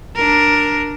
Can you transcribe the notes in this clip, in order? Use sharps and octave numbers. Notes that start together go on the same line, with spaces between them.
D4 A#4